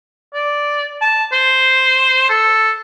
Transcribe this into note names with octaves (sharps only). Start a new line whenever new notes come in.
D5
A5
C5
A4